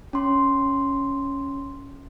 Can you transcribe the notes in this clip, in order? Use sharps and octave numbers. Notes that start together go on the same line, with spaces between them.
C#4 C6